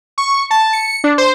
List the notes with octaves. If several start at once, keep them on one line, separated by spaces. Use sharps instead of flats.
C#6
A5
C#7
D4
C5